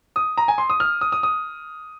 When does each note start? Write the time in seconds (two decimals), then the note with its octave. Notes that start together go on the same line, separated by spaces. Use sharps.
0.16 D#6
0.37 A#5
0.48 G#5
0.58 C6
0.70 D#6
0.80 F6
1.01 D#6
1.12 D#6
1.23 D#6